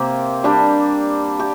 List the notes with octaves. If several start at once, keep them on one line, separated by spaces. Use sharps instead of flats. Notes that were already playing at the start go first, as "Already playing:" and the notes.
Already playing: C3 A#3 G4
G3 D4 G4
G4